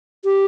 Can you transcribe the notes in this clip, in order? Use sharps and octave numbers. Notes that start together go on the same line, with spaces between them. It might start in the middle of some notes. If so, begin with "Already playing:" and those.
G4